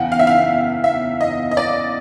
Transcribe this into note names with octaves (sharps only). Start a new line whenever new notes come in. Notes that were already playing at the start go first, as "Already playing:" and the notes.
Already playing: E2 C#3 F#5 G5
F5
E5
F5
E5
D#5
D#5
D5